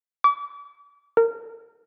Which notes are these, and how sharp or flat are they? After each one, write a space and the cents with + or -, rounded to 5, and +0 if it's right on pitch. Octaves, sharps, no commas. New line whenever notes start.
D6 -35
A#4 -20